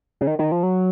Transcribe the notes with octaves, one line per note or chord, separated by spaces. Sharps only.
C#3
D#3
D#3
F3
F#3